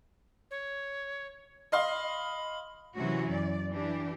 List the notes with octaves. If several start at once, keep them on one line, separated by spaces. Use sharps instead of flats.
C#5
D#5 F5 B5 C6
C3 E3 F#3 C#4 F#4
F#2 D5
E3 D4 G4